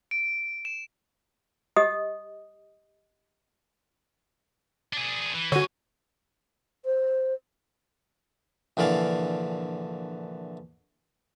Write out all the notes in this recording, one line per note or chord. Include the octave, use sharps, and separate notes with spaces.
D7
E7
G4 D#5 D#6
D4 G#4
E3
G2 D3 F#4 C#5 G#5
C5
A#1 D3 E3 D5 F5 G#5